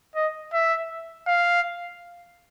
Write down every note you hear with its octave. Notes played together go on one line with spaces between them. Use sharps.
D#5
E5
F5